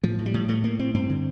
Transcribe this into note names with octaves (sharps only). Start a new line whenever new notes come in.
A2 F3
A2
G3
A2
A2 A3
A2 A#3
A2 C4
G2 C4
D3